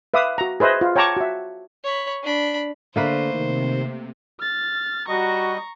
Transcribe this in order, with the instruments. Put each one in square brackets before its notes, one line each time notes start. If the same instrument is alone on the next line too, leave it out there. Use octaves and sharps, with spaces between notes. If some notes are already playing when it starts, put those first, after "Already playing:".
[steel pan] B4 E5 F5 D6 D#6
F#4 A#5
G#4 B4 C5 D#5 E5
F4
C#5 G5 A5 A#5 C#6 D6
F#4 E5
[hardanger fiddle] C#5 B5
D4 B5
[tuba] D3 [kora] A3 A#3 B4 [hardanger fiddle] C5
[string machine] C3 [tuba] D#3
[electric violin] F6 A6
[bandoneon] G3 D#5 [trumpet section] F#4 [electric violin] A#5 C#6